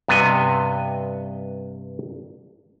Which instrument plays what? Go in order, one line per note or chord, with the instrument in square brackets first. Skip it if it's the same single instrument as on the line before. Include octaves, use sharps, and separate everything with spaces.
[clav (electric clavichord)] G2 C3 B3 D#5 G#5